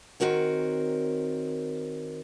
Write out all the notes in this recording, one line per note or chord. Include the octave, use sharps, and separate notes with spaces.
D#3 C4 F#4 A#4 C#5